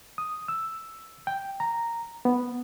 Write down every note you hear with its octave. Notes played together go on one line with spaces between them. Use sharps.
D#6
E6
G5
A#5
B3